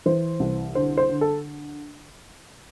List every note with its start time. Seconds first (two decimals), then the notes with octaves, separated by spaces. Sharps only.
0.06 E3 C5
0.40 C2
0.75 D3 C5
0.97 C5
1.09 D3
1.21 A4